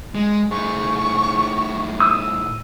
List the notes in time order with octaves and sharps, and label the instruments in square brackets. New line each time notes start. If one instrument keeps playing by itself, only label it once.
[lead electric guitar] G#3
[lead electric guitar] A2 G#4 [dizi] C#6
[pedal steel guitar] D#6 E6